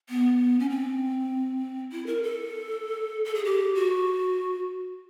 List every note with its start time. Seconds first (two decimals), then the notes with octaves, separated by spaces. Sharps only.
0.09 B3
0.59 C#4
0.70 C4
1.92 E4
2.06 A#4
2.23 A4
3.25 A4
3.35 G#4
3.45 G4
3.75 F#4